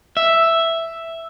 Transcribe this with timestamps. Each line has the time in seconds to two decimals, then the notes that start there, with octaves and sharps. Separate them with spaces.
0.17 E5